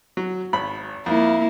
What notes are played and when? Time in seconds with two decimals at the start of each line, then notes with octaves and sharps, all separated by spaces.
0.17 F#3
0.53 G#1 B5
1.06 F2 A#3 E4